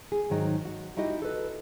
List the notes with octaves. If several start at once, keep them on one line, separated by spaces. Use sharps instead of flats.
G#4
G#2 D#3 F#3 D#4
F#4
D#4 E4 F#4 G4 D#5
A4 B4